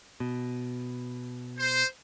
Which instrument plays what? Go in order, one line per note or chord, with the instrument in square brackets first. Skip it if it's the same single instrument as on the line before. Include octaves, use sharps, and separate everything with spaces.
[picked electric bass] B2
[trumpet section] C5